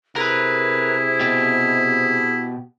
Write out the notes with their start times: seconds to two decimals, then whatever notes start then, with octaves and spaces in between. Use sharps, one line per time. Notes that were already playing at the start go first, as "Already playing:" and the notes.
0.16 C3 E4 G#4 A#4 B4
1.20 B2 G4